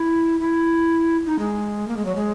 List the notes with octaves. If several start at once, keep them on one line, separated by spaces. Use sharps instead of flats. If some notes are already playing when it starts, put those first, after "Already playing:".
Already playing: E4
E4
D#4
G#3
A#3
G#3
F#3
G#3